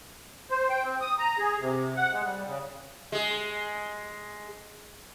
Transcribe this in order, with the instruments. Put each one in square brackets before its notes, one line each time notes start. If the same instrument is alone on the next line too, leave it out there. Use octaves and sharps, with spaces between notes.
[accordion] C5
G5
C4
D#6
A#5
G#4
C3
F#5
G#3
G3
C#3
[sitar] G#3 G#4